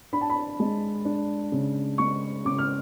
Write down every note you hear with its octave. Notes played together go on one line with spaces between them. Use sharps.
D4 B5
A5
B5
G#3
D4
C#3
G#3 C#6
C#3 D6
F6